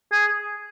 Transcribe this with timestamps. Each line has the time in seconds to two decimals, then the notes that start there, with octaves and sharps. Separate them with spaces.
0.12 G#4